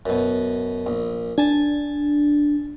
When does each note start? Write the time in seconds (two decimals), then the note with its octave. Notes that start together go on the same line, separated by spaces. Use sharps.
0.06 F#2 B2
0.86 A#1
1.38 D4 G#5 A5